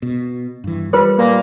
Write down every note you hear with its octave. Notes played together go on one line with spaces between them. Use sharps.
B2
G2 E3
G3 F4 B4 C5
A#2 A#3